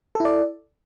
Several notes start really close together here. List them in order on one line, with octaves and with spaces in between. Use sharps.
A4 E4 D5